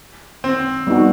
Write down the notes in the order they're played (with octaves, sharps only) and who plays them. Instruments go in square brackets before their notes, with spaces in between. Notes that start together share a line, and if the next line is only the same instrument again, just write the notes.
[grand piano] C4
[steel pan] G3 B3 D#4 F#4